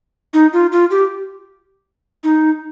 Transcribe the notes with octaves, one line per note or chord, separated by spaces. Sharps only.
D#4
F4
F4
G4
D#4